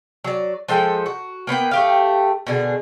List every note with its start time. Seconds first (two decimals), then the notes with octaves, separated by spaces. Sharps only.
0.24 F#3 D5
0.68 F3 G#3 A4 G5
1.06 F#4
1.47 A#3 B3 B4 G5
1.71 A3 G4 F5
2.47 B2 D3 G#4